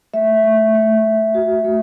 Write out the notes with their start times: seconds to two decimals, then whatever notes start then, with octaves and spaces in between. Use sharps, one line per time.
0.14 A3 E5
0.44 A3
0.75 A3
1.04 A3
1.34 F#4
1.65 A3